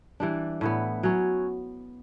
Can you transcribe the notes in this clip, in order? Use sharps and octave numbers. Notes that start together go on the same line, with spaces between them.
E3 G3 D4
A2 E3 B3
F#3 C#4